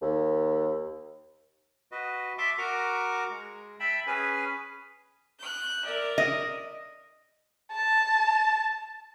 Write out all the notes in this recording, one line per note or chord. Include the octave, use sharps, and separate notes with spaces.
D#2
F#4 B4 D#5
E5 A5 C6 D6
F#4 A#4 A#5 C#6 D6
G#3
E5 G5 A5 B5
C#4 G#4 B4 G#5
F#6 G6
A#4 D5 E5
D#5
A5